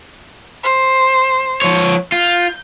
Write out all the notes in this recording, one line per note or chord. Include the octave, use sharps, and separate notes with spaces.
C5
F3 C#5
F4 G6